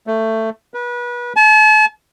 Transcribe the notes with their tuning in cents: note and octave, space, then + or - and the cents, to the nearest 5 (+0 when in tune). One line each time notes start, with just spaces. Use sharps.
A3 +15
B4 -30
A5 -40